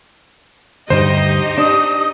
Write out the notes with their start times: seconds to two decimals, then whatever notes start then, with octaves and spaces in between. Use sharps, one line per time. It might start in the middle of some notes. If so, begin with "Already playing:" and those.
0.90 D2 G2 D#4 G4 C5 D#5
1.58 D4 D#6